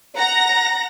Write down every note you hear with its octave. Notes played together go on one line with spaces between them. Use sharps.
F#5 A#5 A#6